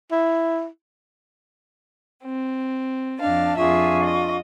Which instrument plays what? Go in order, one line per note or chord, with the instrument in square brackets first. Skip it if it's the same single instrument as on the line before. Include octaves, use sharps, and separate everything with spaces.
[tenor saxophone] E4
[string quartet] C4
[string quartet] F2 F5 A5 [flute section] D4 D#5
[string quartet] F2 G#4 E5 [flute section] D4 F4 C#6
[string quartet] D#5